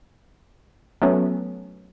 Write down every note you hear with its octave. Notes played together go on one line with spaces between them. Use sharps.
F#3 A3 B3 C#4